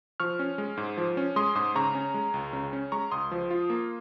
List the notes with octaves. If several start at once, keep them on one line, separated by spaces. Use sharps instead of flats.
F3 C#6 F6
C#4
G#3
G#2
F3
C#4
G#3 C6 D#6
G#2 C6 D#6
C#3 A#5 C#6
C#4
G#3
C#2
C#3
C#4
G#3 A#5 C#6
C#2 C6 D#6
F3
F4
A#3